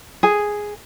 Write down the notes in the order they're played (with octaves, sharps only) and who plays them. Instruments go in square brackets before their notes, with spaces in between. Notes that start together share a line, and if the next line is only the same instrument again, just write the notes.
[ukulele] G#4